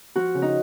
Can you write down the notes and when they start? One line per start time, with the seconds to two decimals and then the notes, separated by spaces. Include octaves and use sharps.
0.16 F3 F#4
0.35 C#3
0.42 D#4